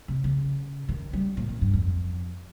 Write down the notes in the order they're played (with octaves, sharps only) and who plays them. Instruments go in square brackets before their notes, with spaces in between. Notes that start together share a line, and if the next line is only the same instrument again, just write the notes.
[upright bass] C3
C#3
D#3
G3
A#2
A#2
G2
F2